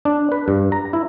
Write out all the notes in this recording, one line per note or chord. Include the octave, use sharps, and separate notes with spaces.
D4
B4
G2
A#5
E4